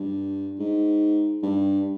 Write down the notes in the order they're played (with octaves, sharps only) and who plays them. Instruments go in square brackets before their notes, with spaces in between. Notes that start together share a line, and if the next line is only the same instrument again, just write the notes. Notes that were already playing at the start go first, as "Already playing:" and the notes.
Already playing: [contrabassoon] G2
G#2
G2